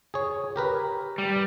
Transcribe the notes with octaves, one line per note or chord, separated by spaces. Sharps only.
G#4 C#5
G4 A#4 B4
G3